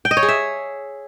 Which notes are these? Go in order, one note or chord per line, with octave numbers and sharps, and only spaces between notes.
G5
D#5
C#5
G#4
E5